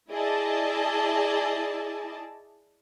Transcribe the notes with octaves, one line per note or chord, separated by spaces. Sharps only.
E4 G#4 D5 D#5 A5